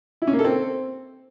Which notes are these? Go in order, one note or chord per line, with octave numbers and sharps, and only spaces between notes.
E4
C#4
A#3
A4
C4